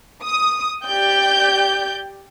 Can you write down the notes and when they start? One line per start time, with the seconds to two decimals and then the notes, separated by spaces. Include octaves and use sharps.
0.24 D#6
0.85 G4 D5 G5 G6